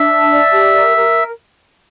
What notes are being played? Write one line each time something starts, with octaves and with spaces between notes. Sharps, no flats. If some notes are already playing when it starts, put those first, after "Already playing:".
Already playing: D4 E5
A5
D5
G4
A#4
A#4